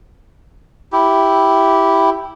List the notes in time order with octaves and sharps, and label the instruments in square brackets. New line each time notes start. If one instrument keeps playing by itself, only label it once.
[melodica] E4 G4